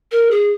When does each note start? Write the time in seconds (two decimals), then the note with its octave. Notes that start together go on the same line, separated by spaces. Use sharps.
0.11 A#4
0.30 G#4